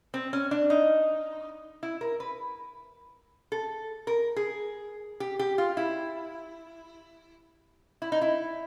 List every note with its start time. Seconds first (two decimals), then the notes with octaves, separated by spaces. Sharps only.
0.14 C4
0.33 C#4
0.51 D4
0.70 D#4
1.83 E4
2.01 A#4
2.20 B4
3.52 A4
4.07 A#4
4.36 G#4
5.20 G4
5.39 G4
5.58 F4
5.77 E4
8.02 E4
8.12 D#4
8.22 E4